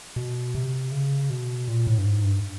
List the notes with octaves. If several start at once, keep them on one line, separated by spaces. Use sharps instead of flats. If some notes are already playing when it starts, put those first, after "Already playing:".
B2
C3
C#3
B2
A#2
A2
G2
G#2
G2